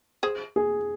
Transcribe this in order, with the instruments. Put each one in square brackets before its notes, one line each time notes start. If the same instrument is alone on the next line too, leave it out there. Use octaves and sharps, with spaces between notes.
[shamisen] G#4 C5
[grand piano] G#4